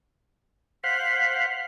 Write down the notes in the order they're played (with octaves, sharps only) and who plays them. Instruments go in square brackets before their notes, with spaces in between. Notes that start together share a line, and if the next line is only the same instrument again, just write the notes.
[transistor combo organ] C5 F5 F#5 [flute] B6